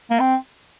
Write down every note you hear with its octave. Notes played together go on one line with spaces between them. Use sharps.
A#3
C4